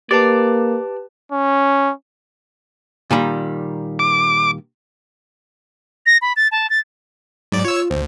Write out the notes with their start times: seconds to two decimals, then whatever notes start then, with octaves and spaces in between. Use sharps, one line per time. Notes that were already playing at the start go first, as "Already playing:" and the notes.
0.11 A#3 G4 B4 D5 A5
1.32 C#4
3.11 A#2 D#3 G3
3.99 D6
6.06 A#6
6.22 B5
6.36 A6
6.52 A5
6.70 A6
7.52 G#2 F#3 D5
7.65 F4 C#5 E6
7.90 D2 C5